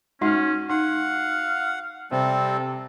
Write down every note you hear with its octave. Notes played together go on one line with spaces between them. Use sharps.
G#3 C#4 D#4 F#4 F6
D#4 F5 F#5
C3 G3 C4 A4